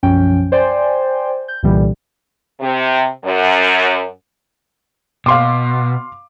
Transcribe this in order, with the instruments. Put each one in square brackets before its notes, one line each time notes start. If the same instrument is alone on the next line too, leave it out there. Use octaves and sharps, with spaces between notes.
[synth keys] B1 F#2 F3 C#4 G5
C5 D5 G5 G#5 C6
G6
C2 A#2 D3 E3 G3
[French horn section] C3
F#2
[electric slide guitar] B2 [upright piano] F5 C6 D6